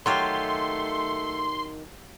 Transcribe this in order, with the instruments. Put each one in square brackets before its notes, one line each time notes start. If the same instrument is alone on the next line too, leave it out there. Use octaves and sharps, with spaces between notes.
[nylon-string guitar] D#3 [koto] F#3 F4 G4 [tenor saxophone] A3 [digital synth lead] C6